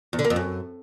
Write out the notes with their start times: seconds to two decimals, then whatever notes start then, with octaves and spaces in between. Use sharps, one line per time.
0.13 E2
0.19 D3
0.25 A#3
0.30 F2
0.36 F#2